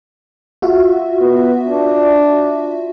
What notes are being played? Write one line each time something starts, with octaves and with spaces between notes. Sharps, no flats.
F4 F#4 E5
B3
D4